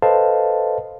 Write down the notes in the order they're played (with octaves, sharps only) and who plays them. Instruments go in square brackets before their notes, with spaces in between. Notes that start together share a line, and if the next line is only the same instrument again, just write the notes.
[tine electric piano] A4 B4 C5 D#5 F5 A5